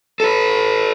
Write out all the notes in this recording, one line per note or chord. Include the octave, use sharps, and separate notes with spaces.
A4 B4